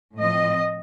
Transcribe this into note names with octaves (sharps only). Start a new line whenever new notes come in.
A2 F3 C4 D#5